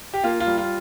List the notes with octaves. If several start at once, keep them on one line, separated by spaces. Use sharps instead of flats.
G4
A#3 F4
F4
G3
F4